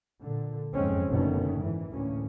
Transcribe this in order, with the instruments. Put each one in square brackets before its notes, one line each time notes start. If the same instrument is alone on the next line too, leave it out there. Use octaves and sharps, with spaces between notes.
[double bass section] A#2 D3
F#1 F2 G#2 G#3 C4 C#4
F#1 B2 D3 D#3 A3 C#4
G#2 E3
D2 A2 A#3 C#4